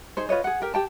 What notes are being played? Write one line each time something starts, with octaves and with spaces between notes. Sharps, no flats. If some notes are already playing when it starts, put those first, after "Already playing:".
D#4 G#4 C5
F4 B4 C#5 D#5
G#4 F#5
G4 A#4
G4 G5 A5